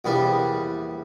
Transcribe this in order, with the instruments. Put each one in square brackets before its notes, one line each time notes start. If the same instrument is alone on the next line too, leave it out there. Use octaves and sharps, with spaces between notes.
[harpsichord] A#1 E2 G3